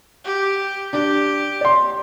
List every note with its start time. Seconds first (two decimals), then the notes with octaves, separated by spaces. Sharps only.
0.25 G4
0.93 D4 G4
1.61 D5 C6